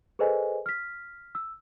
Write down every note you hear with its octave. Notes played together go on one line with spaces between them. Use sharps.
G#4 A4 B4 C5 D#5 G#5
F6 B6
E6